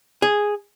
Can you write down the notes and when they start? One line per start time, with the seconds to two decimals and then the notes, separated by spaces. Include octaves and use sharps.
0.22 G#4